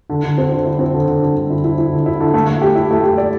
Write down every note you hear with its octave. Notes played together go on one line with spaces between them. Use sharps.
D3
D3
C4
D3
E4
C4
D3
D3
D3
D3
E4
E4
E4
D3
E4
D3
A3
A3
G4
E4
A3
G4
D5